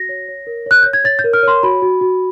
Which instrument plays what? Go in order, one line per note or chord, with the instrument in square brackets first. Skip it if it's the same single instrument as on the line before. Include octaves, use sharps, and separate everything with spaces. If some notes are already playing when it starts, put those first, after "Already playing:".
Already playing: [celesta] F#4 A#6
C#5
C#5
A#4
C#5 F#6
C#5 G6
G#6
C#5 A6
G6
A#4
F6
C#5 C6
F#4 B5
F#4
F#4